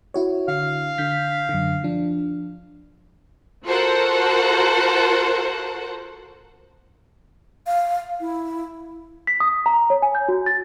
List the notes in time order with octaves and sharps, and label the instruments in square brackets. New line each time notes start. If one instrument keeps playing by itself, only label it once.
[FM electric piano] E4 F#4 C#5
[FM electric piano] D3 [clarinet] F5
[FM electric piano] D3 G6 B6
F#2 D3
F3 D4
[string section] F4 F#4 A4 A#4 C5 F#5
[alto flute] F5
E4
[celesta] B6
D#6
A#5
C#5
G#5
G6
F#4
A6